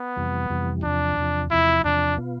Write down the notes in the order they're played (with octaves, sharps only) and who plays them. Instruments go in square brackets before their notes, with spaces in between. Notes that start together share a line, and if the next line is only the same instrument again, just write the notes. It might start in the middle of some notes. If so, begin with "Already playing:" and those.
Already playing: [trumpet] B3
[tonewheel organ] F2 C3 E3 G3
F2 C3 E3 G3
[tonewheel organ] E2 C3 F3 [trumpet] D4
[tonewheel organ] E2 C3 F3
[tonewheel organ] E2 C3 F3 [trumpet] E4
[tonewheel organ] E2 C3 F3 [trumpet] D4
[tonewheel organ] B2 B3 F4